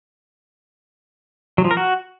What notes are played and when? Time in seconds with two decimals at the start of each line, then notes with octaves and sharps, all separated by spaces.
1.58 F#3
1.64 F3
1.71 A#4
1.77 F#4